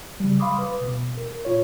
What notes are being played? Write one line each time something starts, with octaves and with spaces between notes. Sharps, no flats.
C#3 G3
F5 B5 C6 D6 D#6
B4
B2
A#4
A#2 F4 C#5